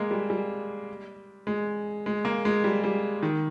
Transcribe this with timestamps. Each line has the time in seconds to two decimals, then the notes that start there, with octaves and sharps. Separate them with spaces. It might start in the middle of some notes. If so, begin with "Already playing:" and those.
Already playing: G#3 A#3
0.11 G3
0.30 G3
1.47 G#3
2.06 G#3
2.25 A#3
2.45 G#3
2.64 G3
2.84 G3
3.23 D#3